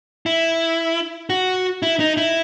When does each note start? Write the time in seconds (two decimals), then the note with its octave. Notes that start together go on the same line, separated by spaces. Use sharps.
0.26 E4
1.30 F#4
1.82 E4
2.00 D#4
2.17 E4